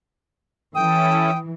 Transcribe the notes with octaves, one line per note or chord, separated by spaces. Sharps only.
E3 C#4 E4 A4 G5 D#6